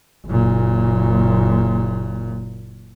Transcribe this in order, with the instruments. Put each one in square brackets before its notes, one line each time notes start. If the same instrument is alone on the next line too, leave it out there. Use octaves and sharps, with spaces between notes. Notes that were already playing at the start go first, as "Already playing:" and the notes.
[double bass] F#1 A#2